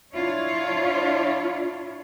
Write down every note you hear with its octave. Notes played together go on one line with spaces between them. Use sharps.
D4 E4 F4 C#5